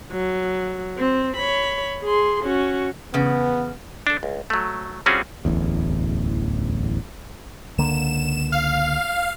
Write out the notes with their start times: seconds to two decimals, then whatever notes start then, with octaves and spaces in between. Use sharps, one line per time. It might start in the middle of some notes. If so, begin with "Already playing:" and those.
0.12 F#3
0.98 C4
1.37 C#5 B5
2.04 G#4 C6
2.44 C#4 F#4
3.14 E2 C#3 B3
4.07 D4 A4
4.23 C#2
4.50 F#3 A3
5.06 G3 C4 C#4 F4 F#4 G#4
5.45 D1 A1 E2
7.78 C#2 D3 A#3 E7
8.52 F5